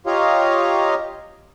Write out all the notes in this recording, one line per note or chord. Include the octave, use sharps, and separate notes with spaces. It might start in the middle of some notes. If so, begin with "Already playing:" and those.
F4 G4 C#5 D#5 F5 A#5